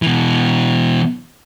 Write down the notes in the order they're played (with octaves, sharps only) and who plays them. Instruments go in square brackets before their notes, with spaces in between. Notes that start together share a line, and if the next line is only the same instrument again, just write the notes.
[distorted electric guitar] B2 E3